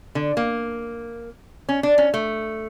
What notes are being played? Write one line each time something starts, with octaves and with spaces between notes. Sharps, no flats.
D3
A#3
C#4
D4
C#4
A3